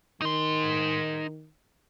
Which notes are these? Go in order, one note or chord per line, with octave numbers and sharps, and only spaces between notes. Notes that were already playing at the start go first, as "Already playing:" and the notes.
D#3 D#4 C6